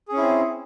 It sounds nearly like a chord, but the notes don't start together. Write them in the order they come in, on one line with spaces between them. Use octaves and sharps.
G#4 C#4 E4 C4